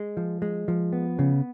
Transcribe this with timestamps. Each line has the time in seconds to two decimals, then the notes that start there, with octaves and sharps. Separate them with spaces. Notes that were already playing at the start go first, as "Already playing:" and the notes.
Already playing: G#3
0.17 F3
0.42 G#3
0.68 F3
0.93 B3
1.19 C#3